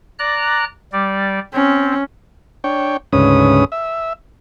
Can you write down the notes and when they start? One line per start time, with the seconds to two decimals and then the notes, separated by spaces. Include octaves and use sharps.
0.19 D5 A#5 F#6
0.93 G3 D5
1.53 C4 C#4
2.64 D4 C#5 G5
3.13 D2 G#2 C#3 C#4 B4 D#6
3.72 E5